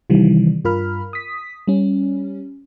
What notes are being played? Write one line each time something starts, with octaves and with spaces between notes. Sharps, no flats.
C3 D#3 E3 G3
G2 F4 A#4 B5 F6
D#6 B6
G3 C#4